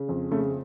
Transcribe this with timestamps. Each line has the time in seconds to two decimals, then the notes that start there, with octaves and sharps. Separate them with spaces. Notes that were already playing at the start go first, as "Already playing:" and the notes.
Already playing: C#3
0.09 F2
0.31 C#3 A3